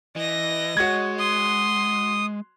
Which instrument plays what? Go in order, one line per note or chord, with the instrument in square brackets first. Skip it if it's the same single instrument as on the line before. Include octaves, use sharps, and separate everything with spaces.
[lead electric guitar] E3 [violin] D#5 A#6
[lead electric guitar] G#3 [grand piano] F#4 C#5 G#6
[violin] C6 [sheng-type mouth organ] D#6